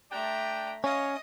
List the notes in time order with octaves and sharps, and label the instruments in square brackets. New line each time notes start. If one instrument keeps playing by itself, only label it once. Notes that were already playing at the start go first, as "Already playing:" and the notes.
[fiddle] A3 A#5 [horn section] D4 D5 G5
[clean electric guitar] C#4 [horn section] C#5 F5 [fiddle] D#5